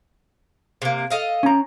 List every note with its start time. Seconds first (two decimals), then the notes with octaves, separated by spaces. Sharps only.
0.82 C3 A#3
1.10 A4 D#5 F5
1.43 C#4 A#5